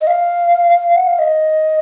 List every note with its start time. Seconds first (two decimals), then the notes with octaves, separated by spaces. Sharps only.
0.01 D#5
0.07 F5
0.96 F#5
1.07 F5
1.19 D#5